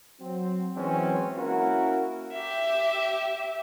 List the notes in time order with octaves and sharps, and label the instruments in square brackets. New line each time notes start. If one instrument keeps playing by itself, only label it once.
[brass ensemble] F#3 C4
E3 F#3 G#3 C4 C#4
A#3 C#4 E4 F#4 A#4
[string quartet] G4 E5